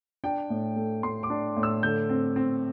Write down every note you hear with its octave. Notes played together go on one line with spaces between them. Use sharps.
D4 G5
A2
A3
A2 C6
D6
D4
A2
E6
D3 G6
C4
C4